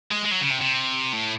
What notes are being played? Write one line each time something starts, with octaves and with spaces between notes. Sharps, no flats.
G#3
G#3
F#3
C#3
C3
C3
A2